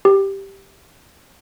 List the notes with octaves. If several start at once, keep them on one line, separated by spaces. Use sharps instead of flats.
G4